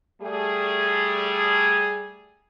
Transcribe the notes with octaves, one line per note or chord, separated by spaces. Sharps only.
G3 A3 G#4